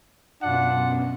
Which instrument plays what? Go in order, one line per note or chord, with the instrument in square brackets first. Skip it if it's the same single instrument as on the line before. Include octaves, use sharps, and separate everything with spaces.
[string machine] F#2 B2 [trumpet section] D4 F4 F#5